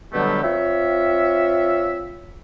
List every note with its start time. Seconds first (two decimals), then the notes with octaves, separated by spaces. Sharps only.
0.13 B2 D3 F#3 G3 A3 G4
0.43 C4 F4 C#5 E5